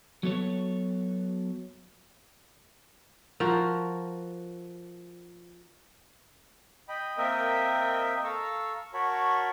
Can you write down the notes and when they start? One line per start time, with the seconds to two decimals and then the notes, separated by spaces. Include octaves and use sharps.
0.23 F#3 B3 A4 C#5
3.40 F3 F#4 A#4
6.89 D#5 G5 B5
7.18 A#3 C4 A#4 D#5 E5 G5
8.24 A4 F5 A#5 C#6 E6
8.94 F#4 A#4 C#5 A5 B5 C#6